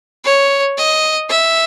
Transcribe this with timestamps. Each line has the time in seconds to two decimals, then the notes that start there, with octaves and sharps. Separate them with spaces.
0.25 C#5
0.78 D#5
1.30 E5